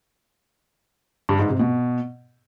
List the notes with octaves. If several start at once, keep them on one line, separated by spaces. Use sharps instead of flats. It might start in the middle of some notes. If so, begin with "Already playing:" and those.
G2
G#2
C3
B2